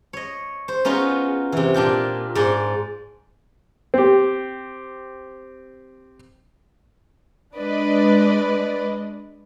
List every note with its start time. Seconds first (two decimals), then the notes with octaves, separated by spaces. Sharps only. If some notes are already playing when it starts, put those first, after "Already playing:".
0.13 C#5 D#5
0.68 C5
0.85 B3 C#4 D#4 F4 F#4 G#4
1.52 C3 E3
1.74 A#2 D4 F4 G4
2.35 G#2 D5 G#5 C6
3.94 C4 G4
7.57 G#3 D4 B4 D5 D#5